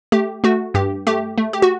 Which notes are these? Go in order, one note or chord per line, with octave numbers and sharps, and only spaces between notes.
A3 G4
A3 F#4
G2 G4
A3 G4
A3
G4
F#4